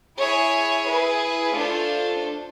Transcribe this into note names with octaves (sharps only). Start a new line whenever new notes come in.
E4 G#4 C#5 E5 G#5
E4 G#4 B4
A3 D4 F4 A4 C5